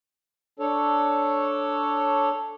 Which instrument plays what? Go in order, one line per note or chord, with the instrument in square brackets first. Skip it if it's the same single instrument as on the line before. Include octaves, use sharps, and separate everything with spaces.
[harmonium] D4 A4 C#5